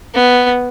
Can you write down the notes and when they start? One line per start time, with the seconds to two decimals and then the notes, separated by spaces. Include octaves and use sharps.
0.14 B3